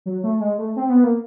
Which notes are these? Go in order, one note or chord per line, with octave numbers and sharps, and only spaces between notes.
F#3
A3
G#3
A3
C4
B3
A#3